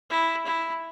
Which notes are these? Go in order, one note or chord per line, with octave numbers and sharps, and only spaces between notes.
E4
E4